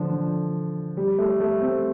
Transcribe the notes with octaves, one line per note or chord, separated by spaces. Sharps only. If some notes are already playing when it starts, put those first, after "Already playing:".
Already playing: D3 F3
F3
G3
A3
A3
C4